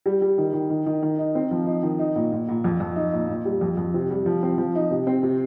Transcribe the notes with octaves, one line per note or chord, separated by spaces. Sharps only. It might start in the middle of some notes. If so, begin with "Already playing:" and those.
G3
G3
D#3
D#3
D#3
D#3
D#3
D#4
C4
F3
D#4
D#3
D#4
A#2
A#2
A#2
F2
F2
D#4
A#2
A#2
G3
F2
F2
C3
G3
F3
C4
F3
D#4
C3
C4
C3